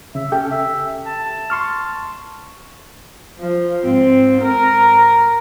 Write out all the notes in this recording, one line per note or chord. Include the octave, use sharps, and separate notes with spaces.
C#3 E5
C#4 G4 A4 G5
E5
A5
C6 C#6 F6
F3
G#2 C4
A#4